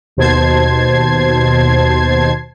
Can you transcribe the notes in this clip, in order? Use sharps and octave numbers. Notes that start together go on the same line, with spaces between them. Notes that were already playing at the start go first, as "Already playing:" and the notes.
D#2 B2 C5 A5 G#6 C7